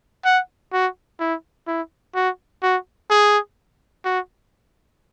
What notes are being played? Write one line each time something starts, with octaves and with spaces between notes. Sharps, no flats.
F#5
F#4
E4
E4
F#4
F#4
G#4
F#4